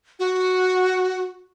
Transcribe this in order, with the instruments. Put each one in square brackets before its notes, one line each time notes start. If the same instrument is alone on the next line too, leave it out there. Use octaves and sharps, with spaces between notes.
[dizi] F#4